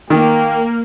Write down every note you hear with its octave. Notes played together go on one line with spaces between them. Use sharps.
D#3 A#3 G5